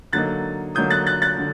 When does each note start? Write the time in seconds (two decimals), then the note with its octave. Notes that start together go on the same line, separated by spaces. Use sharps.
0.13 D3 F#3 A#3 D#4 F#6 A6
0.75 D3 F#3 A#3 D#4 D#6 G6
0.90 F#6 A6
1.07 F#6 A6
1.22 F#6 A6
1.38 D3